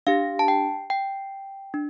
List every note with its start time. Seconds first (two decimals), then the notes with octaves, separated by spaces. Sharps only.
0.07 D4 G4 F5
0.39 A5
0.48 G5
0.90 G5
1.74 D4